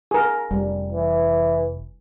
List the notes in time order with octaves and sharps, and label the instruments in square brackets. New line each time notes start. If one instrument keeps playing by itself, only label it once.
[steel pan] G#4 A#4
[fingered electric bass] F1 [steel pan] G3
[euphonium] E3